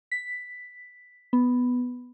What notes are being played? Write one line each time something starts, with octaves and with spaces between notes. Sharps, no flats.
B6
B3